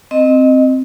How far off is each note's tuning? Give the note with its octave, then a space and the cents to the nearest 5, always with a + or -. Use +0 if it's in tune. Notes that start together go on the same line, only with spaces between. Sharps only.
C4 +0 D#5 -10